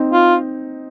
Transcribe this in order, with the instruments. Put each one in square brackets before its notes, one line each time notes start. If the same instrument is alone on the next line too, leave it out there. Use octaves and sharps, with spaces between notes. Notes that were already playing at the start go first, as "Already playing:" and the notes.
Already playing: [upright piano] C4 D#4
[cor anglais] F4